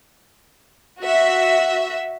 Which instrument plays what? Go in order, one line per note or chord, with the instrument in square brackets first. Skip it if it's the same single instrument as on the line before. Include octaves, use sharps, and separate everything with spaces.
[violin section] F#4 E5